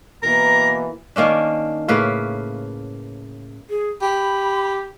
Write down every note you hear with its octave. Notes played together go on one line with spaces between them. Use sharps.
B2 E3 A#3 A#4 A#5
D#3 A#3 C#4 D4
A2 C#3 A#3 B4
G#4
G4 B5